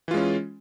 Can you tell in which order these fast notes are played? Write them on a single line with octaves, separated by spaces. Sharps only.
E3 F4 G#3 C#4